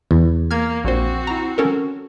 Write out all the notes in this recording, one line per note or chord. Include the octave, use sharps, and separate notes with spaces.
E2
A#3 F6 G#6
A#1 C4 F#4 C5
E4 A#5
C#4 A4 A#4